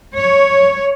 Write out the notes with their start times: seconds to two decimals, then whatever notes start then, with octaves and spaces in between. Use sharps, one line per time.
0.15 C#5